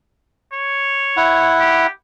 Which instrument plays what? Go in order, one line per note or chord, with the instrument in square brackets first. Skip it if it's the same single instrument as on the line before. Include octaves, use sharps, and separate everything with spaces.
[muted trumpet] C#5
[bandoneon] E4 F#5
[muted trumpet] G4